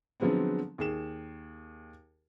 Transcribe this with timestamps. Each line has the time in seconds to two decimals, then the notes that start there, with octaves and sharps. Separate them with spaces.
0.20 D3 F3 F#3 G#3 B3 C4
0.78 D#2 G#4 E7